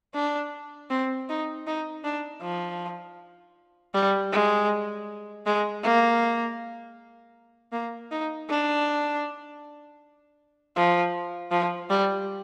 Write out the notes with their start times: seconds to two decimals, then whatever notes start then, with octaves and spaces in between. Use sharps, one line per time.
0.15 D4
0.90 C4
1.29 D#4
1.67 D#4
2.04 D4
2.42 F3
3.94 G3
4.32 G#3
5.46 G#3
5.83 A#3
7.73 A#3
8.11 D#4
8.49 D4
10.77 F3
11.51 F3
11.89 G3